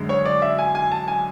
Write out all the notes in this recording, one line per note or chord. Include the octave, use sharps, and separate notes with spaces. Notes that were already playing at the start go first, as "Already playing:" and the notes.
Already playing: F#2 D3 G#3
C#5
D5
E5
G#5
G#5
A5
G#5